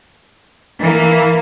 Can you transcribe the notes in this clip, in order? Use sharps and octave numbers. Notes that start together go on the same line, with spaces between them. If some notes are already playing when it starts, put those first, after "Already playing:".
E3 A#3